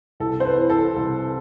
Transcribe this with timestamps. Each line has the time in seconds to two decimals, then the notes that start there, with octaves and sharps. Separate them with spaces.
0.20 C2 A4
0.40 C5
0.45 B4
0.58 E3
0.70 A4
0.96 C2